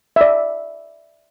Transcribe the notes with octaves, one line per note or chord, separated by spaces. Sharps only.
D5 E5